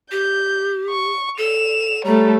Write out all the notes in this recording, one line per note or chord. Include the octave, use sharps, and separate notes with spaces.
G4 G6
C#6
A4 E7 F7
G3 A3 A4 C#5 A#5